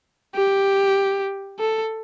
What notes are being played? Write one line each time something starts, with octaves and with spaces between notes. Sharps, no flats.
G4
A4